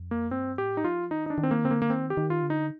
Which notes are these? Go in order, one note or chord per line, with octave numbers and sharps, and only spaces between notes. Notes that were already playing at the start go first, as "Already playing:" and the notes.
Already playing: F2
A#3
G2 C4
A2 G4
D#4
F3 F4
D#3 D#4
D#4
D4
D#3
C4
A#3
D3 C4
A#3
A#3
D#3 C4
G4
D#3
F4
D3
D#4